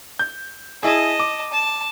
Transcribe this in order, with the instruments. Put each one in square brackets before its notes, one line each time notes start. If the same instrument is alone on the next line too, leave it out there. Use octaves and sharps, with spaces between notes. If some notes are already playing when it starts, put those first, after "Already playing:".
[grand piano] G6
[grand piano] E4 G#4 [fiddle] D#5 A5
[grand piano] D6
[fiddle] A5